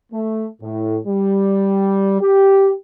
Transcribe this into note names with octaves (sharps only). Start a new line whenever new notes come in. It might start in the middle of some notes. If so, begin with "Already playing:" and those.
A3
A2
G3
G4